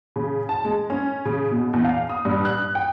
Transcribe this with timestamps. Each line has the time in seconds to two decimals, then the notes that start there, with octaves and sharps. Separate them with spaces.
0.16 C#3
0.49 A5
0.65 G#3
0.90 C#4
1.25 C#3
1.51 B2
1.73 E2
1.84 F5
2.09 D#6
2.25 G2
2.45 F#6
2.75 G5